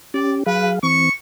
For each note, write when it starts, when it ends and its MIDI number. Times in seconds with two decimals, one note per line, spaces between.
0.14 0.44 61
0.14 0.44 67
0.14 0.35 74
0.46 0.79 54
0.46 0.79 68
0.46 0.70 71
0.46 0.79 77
0.83 1.09 52
0.83 1.09 60
0.83 1.12 85